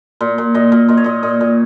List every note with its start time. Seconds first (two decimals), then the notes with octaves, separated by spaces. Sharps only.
0.21 A#2
0.38 A#2
0.54 A#2 D#5
0.72 A#2
0.88 A#2 D#5
0.97 C#5
1.04 A#2 D#5
1.23 A#2 D#5
1.41 A#2